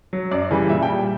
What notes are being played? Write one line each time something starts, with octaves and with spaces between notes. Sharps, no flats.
F#3
F#2 D5
C#3 E3 G3
A#2 E5
G5
G3